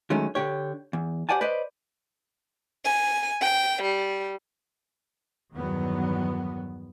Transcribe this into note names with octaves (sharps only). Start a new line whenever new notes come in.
D#3 F#3 G#3 A3 C#4
D3 G4 C#5
E2
G4 C5 D5 F#5 G#5 A5
B4 C5 D5 D#5
G#5
G5
G3
E2 G2 D#3 F#3 B3